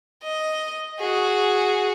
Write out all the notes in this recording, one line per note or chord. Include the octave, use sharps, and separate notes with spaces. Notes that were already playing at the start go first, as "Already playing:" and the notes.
D#5
F#4 G#4